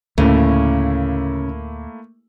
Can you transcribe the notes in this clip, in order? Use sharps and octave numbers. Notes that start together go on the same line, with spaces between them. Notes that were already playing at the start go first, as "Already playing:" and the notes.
D2 A2 C#3 A3 A#3 E4